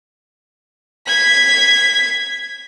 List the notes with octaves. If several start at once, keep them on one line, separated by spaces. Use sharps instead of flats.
G#6 B6